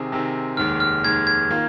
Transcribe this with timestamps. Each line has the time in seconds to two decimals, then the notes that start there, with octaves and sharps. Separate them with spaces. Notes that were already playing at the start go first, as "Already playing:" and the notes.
Already playing: C3 D#3 C4 G#4
0.12 C3 D#3 C4 G#4
0.57 F1 D#2 D#3 G#3 F6
0.80 F6
1.04 F1 D#2 D#3 G#3 G#6
1.27 G#6
1.50 D#3 A#3 F4